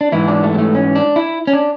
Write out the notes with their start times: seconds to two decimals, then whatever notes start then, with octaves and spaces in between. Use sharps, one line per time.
0.01 D4
0.12 G#2 E3 E4
0.28 D4
0.43 A3
0.55 G#3
0.58 A3
0.75 C#4
0.95 D4
1.16 E4
1.47 C#4
1.53 D4